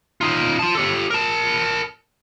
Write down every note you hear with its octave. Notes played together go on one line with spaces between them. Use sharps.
D#4 F4
F4 A5
G4 A4
A#4 A5